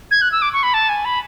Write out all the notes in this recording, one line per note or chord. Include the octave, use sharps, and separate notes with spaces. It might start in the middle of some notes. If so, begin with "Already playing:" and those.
G#6
F#6
E6
D6
C#6
B5
A5
G#5
B5